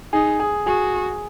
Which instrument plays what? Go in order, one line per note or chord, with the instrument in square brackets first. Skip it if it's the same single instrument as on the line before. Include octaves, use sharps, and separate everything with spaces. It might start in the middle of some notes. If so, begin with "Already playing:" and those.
[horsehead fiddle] D#4 [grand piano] G#4
[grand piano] G#4
[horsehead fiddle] F#4 [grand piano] G#4